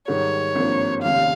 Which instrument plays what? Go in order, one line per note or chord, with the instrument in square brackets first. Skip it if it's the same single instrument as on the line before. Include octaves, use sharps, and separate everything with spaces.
[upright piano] G#2 D#3 G3 [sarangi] C#5
[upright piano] G#1 G2 F3 A#3
[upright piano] F1 D#2 C#3 [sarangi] F5